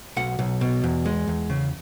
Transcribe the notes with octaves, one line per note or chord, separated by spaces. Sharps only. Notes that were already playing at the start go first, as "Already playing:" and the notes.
B1 F#5
B1
B2
E2
G#3
E2
C#3